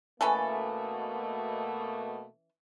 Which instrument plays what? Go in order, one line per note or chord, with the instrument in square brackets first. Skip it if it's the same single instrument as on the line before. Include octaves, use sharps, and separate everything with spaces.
[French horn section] B2 A3 A#3 [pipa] E3 C#4 A4